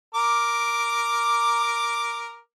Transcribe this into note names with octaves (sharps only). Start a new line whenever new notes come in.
A#4 D6